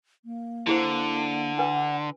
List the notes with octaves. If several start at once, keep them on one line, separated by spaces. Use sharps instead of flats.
A#3
D3 E4 G#4 C5
D4 B4 F#5